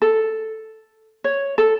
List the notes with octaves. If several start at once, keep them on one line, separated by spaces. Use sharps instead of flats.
A4
C#5
A4